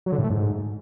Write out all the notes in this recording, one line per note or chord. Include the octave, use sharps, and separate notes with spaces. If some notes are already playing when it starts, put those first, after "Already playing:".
F#3
D3
A2
A3
G#2